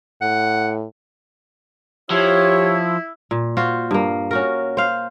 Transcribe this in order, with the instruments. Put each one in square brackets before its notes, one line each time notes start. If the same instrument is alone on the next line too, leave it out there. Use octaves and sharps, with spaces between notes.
[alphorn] A2 [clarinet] F#5
[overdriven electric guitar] F3 [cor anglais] E4 [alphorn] G4 [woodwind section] C#5
[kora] A#2
F4 F#4 C5
G2 A#3
C#4 F#4 A#4
C5 F5